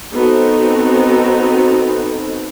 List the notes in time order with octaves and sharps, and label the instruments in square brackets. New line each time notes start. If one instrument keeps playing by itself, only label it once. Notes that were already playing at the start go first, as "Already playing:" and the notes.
[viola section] B3 C4 D#4 F#4 A4